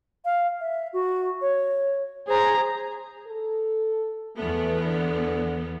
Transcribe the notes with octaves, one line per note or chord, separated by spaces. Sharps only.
F5
E5
F#4
C#5
G#4 C5 A#5
A4
E2 A3 B3
D3